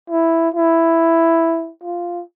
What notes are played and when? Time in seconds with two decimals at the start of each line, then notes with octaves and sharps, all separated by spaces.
0.10 E4
0.54 E4
1.83 F4